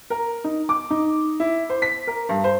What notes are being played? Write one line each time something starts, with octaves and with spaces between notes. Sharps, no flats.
A#4
D#4
D6
D#4
E4
C5
B6
A#4
G2
C5